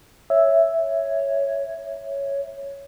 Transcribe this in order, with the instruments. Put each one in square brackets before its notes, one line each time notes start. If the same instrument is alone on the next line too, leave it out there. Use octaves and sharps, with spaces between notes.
[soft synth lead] C#5 [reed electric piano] E5